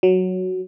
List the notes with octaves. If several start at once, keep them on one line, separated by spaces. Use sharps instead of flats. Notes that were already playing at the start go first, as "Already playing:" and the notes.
F#3